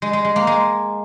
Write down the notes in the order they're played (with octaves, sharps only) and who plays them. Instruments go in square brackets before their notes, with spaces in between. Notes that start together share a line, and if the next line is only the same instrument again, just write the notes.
[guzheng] G#3
G#3
G#3
A#3
G#3